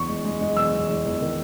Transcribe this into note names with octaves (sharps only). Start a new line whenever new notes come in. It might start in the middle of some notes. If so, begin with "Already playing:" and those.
Already playing: E2 C#6
G#3
G#3
G#3
E2 E6
E2
G#3
E2
D#3